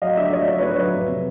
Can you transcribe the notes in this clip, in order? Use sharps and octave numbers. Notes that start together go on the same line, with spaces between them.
F#3 D#5 F5
D3 D5 E5
F#3 C#5 D#5
D3
B4 C#5
D3
B4
F#3
F2
C3